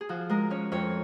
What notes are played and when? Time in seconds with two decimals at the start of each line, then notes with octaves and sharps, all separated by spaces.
0.01 G#4
0.09 F3 F#4
0.30 G#3 A#4
0.50 C#4 C#5
0.72 F2 C#5